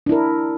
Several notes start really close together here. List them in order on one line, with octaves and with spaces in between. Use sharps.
D4 E4 A#4